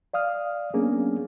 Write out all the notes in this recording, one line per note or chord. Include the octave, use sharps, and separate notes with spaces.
D5 F5 D#6 F6
F#3 A#3 B3 C#4 D4 G#4